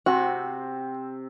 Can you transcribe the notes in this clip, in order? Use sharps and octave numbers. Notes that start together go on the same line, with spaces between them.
C3 C4 F#4